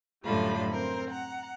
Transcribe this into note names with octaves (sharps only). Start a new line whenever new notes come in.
F#2 A2 D3 G3 F4 B5
C4 A#4 C5
F#5 A#5